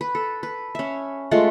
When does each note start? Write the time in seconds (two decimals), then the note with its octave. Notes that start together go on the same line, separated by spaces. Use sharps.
0.01 B4
0.15 A4
0.43 B4
0.75 C#4 E5
1.31 G#3 A3 F4 F#5